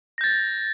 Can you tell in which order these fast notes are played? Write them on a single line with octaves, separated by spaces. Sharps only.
A#6 G6 A6